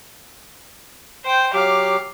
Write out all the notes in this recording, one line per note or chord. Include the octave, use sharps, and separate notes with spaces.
C5 G5
F#3 G4 F5 D6